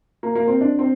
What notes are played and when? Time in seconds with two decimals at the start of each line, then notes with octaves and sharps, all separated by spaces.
0.23 A#3
0.35 A#3
0.47 C4
0.61 D4
0.79 C4